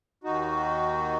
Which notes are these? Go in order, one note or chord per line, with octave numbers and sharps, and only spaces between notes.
D#2 D#3 D#4 F#4